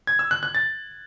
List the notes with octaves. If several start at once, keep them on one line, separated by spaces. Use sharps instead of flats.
G#6
E6
F#6
F#6
A6